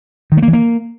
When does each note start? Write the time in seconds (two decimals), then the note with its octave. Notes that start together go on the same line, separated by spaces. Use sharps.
0.32 D#3
0.37 A3
0.43 A#3
0.48 E3
0.53 A#3